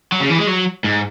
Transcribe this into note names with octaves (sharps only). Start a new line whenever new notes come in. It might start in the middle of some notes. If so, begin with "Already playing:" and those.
F#3
C#3
E3
G#3
F#3
G#2